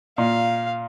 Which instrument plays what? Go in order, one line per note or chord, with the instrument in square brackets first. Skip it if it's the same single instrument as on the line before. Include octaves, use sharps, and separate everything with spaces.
[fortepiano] A#2 [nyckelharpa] F5